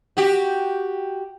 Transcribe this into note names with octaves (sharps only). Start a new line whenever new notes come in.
F#4 G4